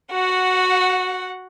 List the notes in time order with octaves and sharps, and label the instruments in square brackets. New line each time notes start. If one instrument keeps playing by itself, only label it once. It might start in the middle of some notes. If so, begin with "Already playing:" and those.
[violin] F#4 F#5